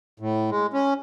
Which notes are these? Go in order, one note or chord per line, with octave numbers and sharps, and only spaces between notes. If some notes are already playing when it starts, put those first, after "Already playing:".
A2
G#3
C#4